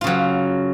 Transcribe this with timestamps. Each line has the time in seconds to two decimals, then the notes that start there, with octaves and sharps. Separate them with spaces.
0.01 F4
0.04 C#3
0.07 F#3